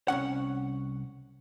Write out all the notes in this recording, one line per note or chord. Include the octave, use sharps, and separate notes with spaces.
C2 G#2 C#4 F#5